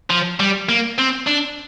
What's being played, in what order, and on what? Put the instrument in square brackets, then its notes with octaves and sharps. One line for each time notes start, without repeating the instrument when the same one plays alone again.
[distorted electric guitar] F3
G3
A#3
C4
D4